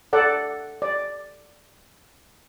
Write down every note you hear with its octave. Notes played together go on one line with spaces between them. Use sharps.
A4 D5 F#5
D5